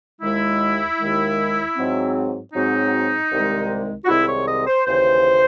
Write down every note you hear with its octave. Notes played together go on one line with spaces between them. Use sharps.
D#2 D#3 G#3 E4
D#2 D#3 G#3
G#2 F#3 C4
G#2 F#3 C4 D#4
C2 C3 D#3 G#3 C4
F#4
C2 C3 D#3 G#3 C4 E4
C#5
D#5
C5
D#2 C#3 E3 C5